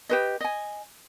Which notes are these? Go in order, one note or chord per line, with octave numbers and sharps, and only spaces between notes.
G4 B4 D#5
D#5 G#5